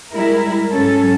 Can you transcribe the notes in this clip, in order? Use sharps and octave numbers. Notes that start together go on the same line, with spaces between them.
G3 G#3 E4 A#4
G#2 F#3 C#4 A4